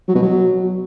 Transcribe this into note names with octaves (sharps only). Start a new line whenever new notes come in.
F#3
B2
F#3